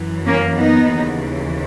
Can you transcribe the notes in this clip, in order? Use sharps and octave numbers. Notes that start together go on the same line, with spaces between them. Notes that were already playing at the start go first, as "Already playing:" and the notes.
Already playing: F#2 E3
A#3 C#4
B3 D#4
D#2 C#3 E3